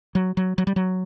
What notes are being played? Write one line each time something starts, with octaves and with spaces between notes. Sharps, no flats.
F#3
F#3
F#3
G3
F#3